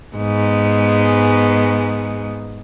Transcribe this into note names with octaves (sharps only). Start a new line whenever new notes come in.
G#2 G#3 B3